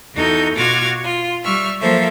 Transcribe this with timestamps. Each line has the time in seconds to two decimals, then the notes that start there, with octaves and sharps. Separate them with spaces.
0.14 E2 D#4 F#4 A4 G6
0.55 B2 F4 F#4 D6 F6 G#6
1.02 F4
1.43 G3 E5 C#6 F6
1.80 F3 F#3 A#3 A4 C5 E5